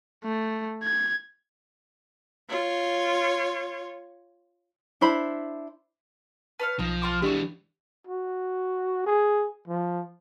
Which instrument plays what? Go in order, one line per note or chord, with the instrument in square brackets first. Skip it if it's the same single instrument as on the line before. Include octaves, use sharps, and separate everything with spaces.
[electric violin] A3
G#6
[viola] F4 C#5
[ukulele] D4 E4 C5 B5
[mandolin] B4 C#5 F5 [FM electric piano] A5
[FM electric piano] B1 A#6 [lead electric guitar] F3 [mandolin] D#4
[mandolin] F4 C6 D6
[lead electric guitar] E3 G#3 [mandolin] A3 F#4 [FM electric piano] D4 G4
[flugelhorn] F#4
G#4
F3